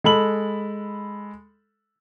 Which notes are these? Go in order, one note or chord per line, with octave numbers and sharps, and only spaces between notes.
G#3 A4 B5 F#7